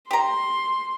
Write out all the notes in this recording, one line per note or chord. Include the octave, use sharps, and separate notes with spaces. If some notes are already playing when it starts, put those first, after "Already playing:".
G4 A#5 C6